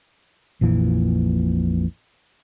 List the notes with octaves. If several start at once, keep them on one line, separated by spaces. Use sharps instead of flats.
A#1 F2 A#2 E3